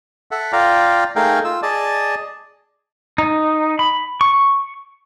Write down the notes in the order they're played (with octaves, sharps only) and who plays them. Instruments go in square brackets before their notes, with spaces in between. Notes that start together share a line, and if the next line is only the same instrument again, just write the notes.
[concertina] A4 E5 F#5
F4 D5 F5 G5 A#5
A3 D#4 G#4 A#4 F5 G5
F4 E6
G#4 D5 D#5 A5
[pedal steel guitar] D#4
B5
C#6